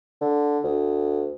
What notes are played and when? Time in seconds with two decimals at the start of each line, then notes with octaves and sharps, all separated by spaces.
0.21 D3
0.64 D2